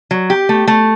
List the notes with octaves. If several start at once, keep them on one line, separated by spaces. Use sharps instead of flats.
F#3
G4
A3
A3